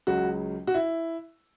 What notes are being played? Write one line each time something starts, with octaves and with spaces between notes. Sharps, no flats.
C#2 C#3 F#3 F#4
F#4
E4